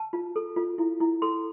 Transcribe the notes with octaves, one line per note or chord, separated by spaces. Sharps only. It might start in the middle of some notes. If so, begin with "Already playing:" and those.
Already playing: A5
F4
A4
F4
E4
E4
A4 C6